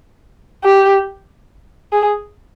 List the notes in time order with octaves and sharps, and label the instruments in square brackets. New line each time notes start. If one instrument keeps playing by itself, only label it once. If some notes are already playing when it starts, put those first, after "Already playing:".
[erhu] G4
G#4